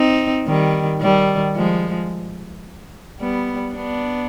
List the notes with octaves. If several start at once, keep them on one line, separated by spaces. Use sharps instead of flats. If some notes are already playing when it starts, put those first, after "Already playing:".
Already playing: C4 D#4
D#3 G3
D#3 G3
F3 G#3
G3 B3
B3 D4